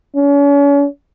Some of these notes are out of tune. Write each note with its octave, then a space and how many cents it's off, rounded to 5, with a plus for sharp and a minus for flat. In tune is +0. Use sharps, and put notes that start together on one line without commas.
C#4 +40